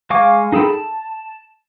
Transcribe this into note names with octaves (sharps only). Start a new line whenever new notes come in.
G#3 F5 G#5 C#6 D6
D#4 G#4 A4 G5 B5
A5